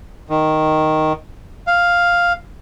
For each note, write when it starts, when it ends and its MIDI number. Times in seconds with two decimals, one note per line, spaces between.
0.30 1.13 51
1.67 2.33 77